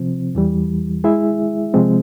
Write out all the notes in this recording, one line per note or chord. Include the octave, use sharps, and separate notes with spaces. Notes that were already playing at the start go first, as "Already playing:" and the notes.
Already playing: C3 F3 C4
E2 E3 G3
G#3 E4 G#4 E5
C3 F3 G#3 C4